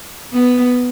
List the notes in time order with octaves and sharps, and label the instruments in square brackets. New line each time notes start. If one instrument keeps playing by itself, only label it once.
[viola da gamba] B3